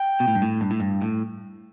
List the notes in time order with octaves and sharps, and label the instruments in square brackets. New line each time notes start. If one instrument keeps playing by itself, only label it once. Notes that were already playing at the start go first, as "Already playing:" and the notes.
Already playing: [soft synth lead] G5
[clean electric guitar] B2
A2
G2
A2
G2
A2
G2
A2